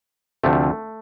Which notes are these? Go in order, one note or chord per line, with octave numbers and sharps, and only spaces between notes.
D2 C3 F3 A3